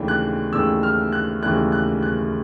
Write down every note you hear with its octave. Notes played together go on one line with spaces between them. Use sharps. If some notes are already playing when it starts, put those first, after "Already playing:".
Already playing: D#2 C#3 E3 A3 D4
F#6
D#2 C#3 E3 A3 D4 E6
F6
F#6
D#2 C#3 E3 A3 D4 F#6
F#6
F#6